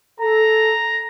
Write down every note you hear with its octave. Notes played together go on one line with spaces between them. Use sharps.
A4 A#5